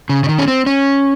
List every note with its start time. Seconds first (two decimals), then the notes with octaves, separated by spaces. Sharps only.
0.09 C#3
0.24 C#3
0.29 D#3
0.38 C#4
0.48 C4
0.66 C#4